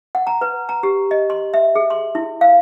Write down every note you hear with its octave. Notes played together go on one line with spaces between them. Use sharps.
F#5
A#5
B4
A#5
G4
D#5
C6
E5
G#4
C6
E4
F5